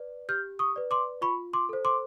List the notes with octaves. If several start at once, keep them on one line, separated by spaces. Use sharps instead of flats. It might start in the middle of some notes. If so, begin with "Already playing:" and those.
Already playing: B4 D5
G4 F6 G6
C#6 D#6
B4 D5
C6 D6
F4 B5 C#6
C6 D6
A4 C5
C6 D6